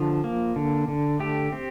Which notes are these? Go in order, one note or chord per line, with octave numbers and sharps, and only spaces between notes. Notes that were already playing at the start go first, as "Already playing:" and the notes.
Already playing: D3 F3
A#3
D3
D3
A3 G4
C4